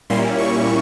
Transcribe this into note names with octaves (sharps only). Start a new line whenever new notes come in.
A#2 G3 A#3 C#4 E4 C6
C#6